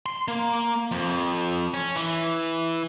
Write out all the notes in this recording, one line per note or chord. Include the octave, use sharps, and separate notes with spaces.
C6
A#3
F2
C#4
E3